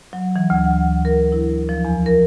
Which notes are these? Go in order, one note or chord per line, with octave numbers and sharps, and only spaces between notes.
F#3
E3
D2
F#5
A#4
E4
F3
E2
A#4